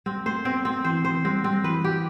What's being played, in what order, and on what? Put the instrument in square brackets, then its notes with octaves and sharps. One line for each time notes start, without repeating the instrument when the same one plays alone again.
[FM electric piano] G3 [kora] C4
[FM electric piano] A3 [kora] C5
[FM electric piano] B3 [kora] C4
[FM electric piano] A3 [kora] C4
[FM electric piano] E3 [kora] C5
[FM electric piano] E3 [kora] C5
[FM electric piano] G3 [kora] C4
[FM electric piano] G3 [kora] C4
[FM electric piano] E3 [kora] B4
[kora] G4